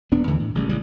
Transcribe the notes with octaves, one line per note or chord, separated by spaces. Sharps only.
D#1 B3 D4
D#2 D3 E3 A3
A2
A1 C#3 G3
A1 C#3 G3